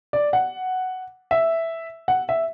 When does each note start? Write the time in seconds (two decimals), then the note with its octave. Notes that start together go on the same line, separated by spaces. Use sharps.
0.13 D5
0.33 F#5
1.31 E5
2.08 F#5
2.29 E5